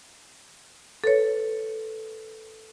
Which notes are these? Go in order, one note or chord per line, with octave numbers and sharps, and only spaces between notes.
A4 B4 C#5